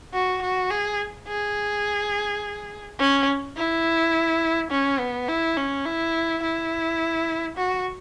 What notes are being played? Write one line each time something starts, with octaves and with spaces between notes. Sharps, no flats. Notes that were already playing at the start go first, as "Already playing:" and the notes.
F#4
F#4
G#4
G#4
C#4
E4
C#4
B3
E4
C#4
E4
E4
F#4